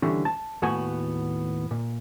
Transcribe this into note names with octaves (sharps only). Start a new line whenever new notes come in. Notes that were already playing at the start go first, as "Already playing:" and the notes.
D3 E3 G3 C#4
A5
D#2 A2 B3 F#4 F#5 G#5
A#2